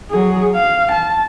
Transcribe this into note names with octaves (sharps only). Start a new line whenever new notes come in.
F#3 G#4
F5
A5